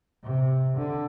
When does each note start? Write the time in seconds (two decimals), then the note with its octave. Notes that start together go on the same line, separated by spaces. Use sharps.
0.24 C3
0.77 D3